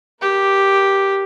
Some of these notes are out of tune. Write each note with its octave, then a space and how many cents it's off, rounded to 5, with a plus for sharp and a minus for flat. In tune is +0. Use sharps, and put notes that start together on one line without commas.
G4 +0 A#4 +30